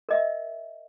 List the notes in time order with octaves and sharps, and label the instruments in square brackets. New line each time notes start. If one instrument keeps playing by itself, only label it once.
[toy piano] A#4 D#5 E5